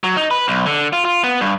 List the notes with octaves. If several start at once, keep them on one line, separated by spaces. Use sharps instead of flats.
F#3
D#4
B4
B1
D3
F4
F4
B3
G2